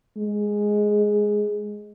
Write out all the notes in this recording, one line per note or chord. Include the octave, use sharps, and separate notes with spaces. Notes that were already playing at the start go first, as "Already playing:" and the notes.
G#3